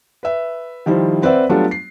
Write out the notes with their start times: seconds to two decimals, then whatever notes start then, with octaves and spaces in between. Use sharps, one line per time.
0.23 B4 E5
0.86 D#3 F3 G3 E4 C5
1.22 C4 B4 C5 D5 E5 F#5
1.49 F#3 G3 A3 B3 D4 F4
1.71 C7